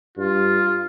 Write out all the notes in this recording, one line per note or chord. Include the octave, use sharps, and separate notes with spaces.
G2 F4